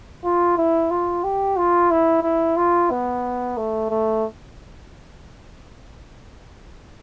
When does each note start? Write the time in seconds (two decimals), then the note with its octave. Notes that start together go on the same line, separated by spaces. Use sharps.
0.24 F4
0.58 E4
0.91 F4
1.24 G4
1.57 F4
1.91 E4
2.23 E4
2.57 F4
2.90 B3
3.57 A3
3.90 A3